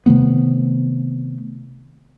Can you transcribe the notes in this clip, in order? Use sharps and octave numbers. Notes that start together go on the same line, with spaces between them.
C3 D#3 A3 B3